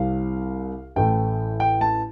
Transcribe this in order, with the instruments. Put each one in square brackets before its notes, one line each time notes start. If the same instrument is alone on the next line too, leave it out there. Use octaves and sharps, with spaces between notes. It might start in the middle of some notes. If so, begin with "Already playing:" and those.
Already playing: [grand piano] C2 C3 G3 F5
A1 A2 A3 G5
G5
A5